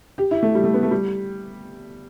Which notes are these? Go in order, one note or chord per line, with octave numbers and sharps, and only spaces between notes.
G4
E4
A3
G3
A3
B3
A3
G3